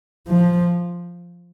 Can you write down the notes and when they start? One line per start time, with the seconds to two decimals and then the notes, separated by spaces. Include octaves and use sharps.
0.28 F3